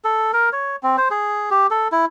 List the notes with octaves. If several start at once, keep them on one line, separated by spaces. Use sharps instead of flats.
A4
A#4
C#5
C4
C5
G#4
G4
A4
E4